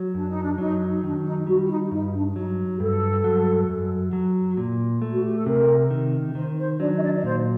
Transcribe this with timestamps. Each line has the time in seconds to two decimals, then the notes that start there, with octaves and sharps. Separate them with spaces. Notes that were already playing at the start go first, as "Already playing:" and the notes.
Already playing: F#3
0.14 F#2 D4
0.28 D#4
0.42 D4
0.58 F#3 D#4
1.03 D#3 D4
1.25 D#4
1.47 G3 F#4
1.64 F#4
1.69 D#4
1.91 G2 D#4
2.13 D4
2.36 F#3 D#4
2.77 G4
2.80 G2 A4
3.24 F#3
3.69 F#2
4.13 F#3
4.57 A#2
5.02 A3
5.12 F#4
5.23 G4
5.35 A4
5.46 C3 A#4
5.90 D#3
6.35 D#3 C5
6.57 C5
6.79 F#3 D4 D5
6.96 D#5
7.01 D4 D5
7.16 D5
7.23 A#2 C5